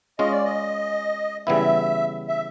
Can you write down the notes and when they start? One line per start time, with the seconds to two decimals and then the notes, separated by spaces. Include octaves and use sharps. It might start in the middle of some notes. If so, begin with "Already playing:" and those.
0.19 G#3 C#4 F4 D#5
0.32 D5
0.45 D#5
1.47 C#3 E3 G3 B3 E4 E5
2.28 E5